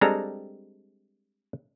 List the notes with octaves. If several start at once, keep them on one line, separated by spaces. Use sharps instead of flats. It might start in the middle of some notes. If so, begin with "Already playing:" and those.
G3 G#3 C4 D4 A4 A#5